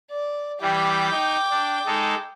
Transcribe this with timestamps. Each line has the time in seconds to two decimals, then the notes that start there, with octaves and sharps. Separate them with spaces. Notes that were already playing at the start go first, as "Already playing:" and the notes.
0.11 D5
0.62 E3 G3 G5 D6
1.11 D#4
1.51 D4
1.86 G#3 D#4 A4